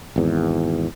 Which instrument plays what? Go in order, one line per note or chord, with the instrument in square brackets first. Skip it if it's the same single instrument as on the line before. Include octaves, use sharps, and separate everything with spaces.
[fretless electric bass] G#1 E2